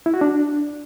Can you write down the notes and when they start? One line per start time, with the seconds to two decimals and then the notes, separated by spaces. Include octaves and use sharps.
0.06 E4
0.14 F#4
0.21 D4